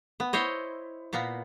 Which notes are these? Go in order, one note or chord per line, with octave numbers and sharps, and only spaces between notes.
B3
E4 C5 C#5 D#5
A#2 A#3 B3